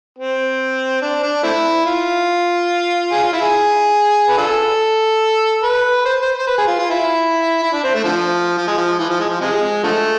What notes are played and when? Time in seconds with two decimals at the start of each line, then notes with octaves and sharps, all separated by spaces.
0.18 C4
1.02 D4
1.23 D4
1.43 A3 C4 E4
1.86 F4
3.12 G#4
3.23 F4
3.33 E4
3.43 G#4
4.29 B4
4.37 D4 F4 A4
5.63 B4
6.05 C5
6.21 C5
6.39 C5
6.47 B4
6.58 G#4
6.68 F4
6.79 F4
6.90 E4
7.62 E4
7.73 D4
7.84 C4
7.94 A3
8.04 D3 F3
8.57 F3
8.67 G#3
8.78 F3
8.99 E3
9.09 F3
9.20 G#3
9.30 F3
9.41 C3 F3 G#3
9.83 D3 F3 A3